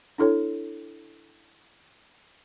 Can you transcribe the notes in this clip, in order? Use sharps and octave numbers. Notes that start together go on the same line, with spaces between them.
D4 E4 A4 C#5